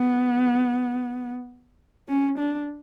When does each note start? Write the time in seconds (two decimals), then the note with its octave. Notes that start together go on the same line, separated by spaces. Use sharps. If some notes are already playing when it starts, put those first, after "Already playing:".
Already playing: B3
2.08 C#4
2.39 D4